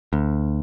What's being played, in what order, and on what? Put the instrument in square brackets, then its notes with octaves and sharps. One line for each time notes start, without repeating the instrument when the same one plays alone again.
[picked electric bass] D2